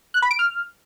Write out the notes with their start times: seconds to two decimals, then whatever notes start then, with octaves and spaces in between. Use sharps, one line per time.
0.14 F#6
0.22 B5
0.31 D7
0.39 F6